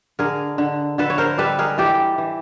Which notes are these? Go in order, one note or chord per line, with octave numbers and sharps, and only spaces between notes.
D3 G#4 A#4
D3
D3 A4 B4
C#5
A#4 C5
G3 A4 B4
G#4 A#4
E3 G4 A4
E3